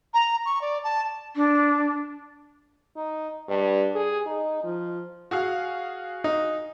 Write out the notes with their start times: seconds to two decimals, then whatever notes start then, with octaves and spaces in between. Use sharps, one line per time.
0.14 A#5
0.46 C#6
0.61 D5
0.84 A5
1.36 D4
2.96 D#4
3.48 G2
3.95 G#4
4.26 D#4
4.64 F3
5.31 F#4 G#4 F5
6.24 D#4